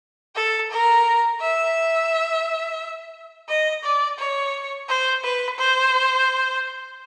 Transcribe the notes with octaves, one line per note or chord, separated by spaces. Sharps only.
A4
A#4
E5
D#5
D5
C#5
C5
B4
C5